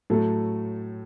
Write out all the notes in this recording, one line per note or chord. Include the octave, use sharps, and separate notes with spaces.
A2 F#3 A3 A4